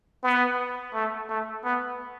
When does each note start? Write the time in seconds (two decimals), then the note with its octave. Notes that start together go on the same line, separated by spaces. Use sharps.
0.23 B3
0.94 A3
1.29 A3
1.64 B3